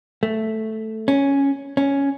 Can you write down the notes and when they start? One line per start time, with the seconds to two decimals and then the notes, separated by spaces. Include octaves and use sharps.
0.23 A3
1.08 C#4
1.77 C#4